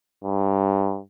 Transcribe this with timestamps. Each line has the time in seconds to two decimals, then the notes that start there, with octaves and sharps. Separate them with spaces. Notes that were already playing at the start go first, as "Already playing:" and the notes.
0.24 G2